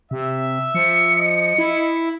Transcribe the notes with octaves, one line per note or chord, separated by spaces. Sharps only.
C3 E5
F3 C#7
D#5
E4